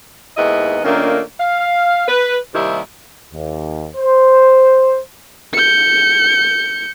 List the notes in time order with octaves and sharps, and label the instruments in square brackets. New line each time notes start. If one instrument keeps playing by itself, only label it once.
[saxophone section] D#2 G#2 B3 E4 D#5
A#2 D#3 A3 A#3 C#4 D4
F5
B4
D#2 C3 D#3 G3 E4
[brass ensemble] D#2
C5
[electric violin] G6 C#7